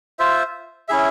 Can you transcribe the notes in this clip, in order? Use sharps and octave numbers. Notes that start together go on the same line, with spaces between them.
F4 C5 E5
C#4 E4 G#4 E5